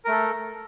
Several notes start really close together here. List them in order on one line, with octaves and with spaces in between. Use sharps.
A#4 A3 A4